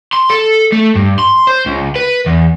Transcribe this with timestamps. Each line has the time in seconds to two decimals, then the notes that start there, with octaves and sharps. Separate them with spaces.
0.13 C6
0.30 A4
0.73 A3
0.95 G2
1.19 C6
1.47 C5
1.66 C#2
1.96 B4
2.26 E2